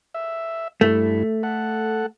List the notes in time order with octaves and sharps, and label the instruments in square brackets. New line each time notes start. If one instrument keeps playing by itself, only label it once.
[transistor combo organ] E5
[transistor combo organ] G2 E4 [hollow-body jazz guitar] A3
[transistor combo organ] A4 F#5